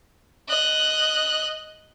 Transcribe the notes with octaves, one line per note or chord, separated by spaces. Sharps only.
D#5 F#6